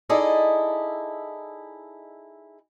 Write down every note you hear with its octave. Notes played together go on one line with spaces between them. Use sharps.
D#4 E4 G#4 A4 D5 D#5